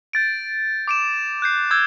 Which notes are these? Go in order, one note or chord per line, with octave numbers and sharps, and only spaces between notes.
G6 A6 D7
D6 D7 E7
F#6 G6 C7
D6 E6 G6 G#6